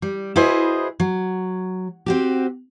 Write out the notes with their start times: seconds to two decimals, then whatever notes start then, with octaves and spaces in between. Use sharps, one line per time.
0.02 G3
0.36 E4 F#4 G#4 B4 C5 D#5
1.00 F#3
2.06 C4 F#4 G4